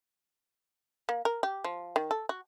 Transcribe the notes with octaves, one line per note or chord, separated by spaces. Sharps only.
A#3
A#4
G4
F3
D#3
A4
F#4